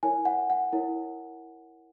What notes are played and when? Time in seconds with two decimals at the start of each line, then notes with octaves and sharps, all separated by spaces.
0.03 E4 A#4 C#5 G#5
0.25 F#5
0.50 F#5
0.73 E4 A#4 C#5